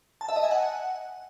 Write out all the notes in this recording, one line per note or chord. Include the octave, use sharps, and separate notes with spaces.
A5
E5
D#5
G#5
F#5